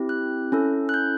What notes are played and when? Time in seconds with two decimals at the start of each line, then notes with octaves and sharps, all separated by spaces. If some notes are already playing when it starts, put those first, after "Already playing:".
Already playing: C4 E4 G4
0.09 F#6
0.52 C#4 E4 A4
0.89 F#6
0.94 G6